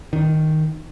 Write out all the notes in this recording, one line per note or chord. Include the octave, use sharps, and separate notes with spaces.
D#3